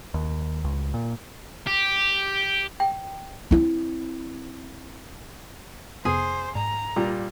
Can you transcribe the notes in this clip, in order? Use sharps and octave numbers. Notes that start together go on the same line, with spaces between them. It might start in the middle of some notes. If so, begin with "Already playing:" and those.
D#2
C#2
A#2
G4
G5
C4 E4
F2 C3 B3 G#4 C5
G#2 A#5
A#2 G3